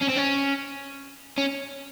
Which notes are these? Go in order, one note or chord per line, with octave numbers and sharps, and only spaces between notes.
C#4
C4
C#4
C#4